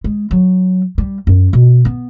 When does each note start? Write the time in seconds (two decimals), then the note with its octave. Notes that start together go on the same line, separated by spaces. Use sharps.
0.04 G#3
0.31 F#3
0.98 G3
1.27 F#2
1.53 B2
1.85 B3